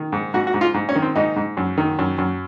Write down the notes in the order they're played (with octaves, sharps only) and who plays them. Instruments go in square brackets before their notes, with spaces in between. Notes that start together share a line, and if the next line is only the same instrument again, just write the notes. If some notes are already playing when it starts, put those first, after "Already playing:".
Already playing: [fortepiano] D#3
G#2
G#2 F#4
F#4
G#2
F4
G#2
C#4
D#3
C4
G#2 D#4
G#2
F#2
D#3
F#2
F#2